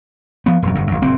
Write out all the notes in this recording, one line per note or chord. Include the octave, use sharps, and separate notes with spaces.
F3 B3
E1 F#2 A2
G1 F#2
G#1 F#2
F#1 A#2 C4